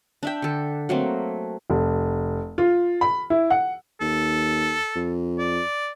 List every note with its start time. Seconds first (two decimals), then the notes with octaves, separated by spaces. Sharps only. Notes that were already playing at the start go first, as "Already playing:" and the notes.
0.23 D4 E5 G5
0.42 D3 A4
0.89 F#3 A3 A#3 C4
1.70 F1
2.58 F4
3.01 B5
3.30 E4
3.50 F#5
4.01 D#2 A4
4.95 F2
5.38 D5